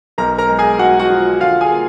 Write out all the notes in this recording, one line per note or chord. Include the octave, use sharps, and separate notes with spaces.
B1 A#4 A#5
A#4 A#5
G#3
G#4 G#5
G#3 F#4 F#5
F#4 F#5
F3
D3 F4 F5
G#4 G#5
A#3